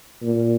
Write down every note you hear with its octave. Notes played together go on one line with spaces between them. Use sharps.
A#2